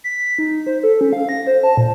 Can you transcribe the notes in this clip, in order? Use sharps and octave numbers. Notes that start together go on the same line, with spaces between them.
B6
D#4
C5
A4
C#4
F5
A#6
C5
A5
A#2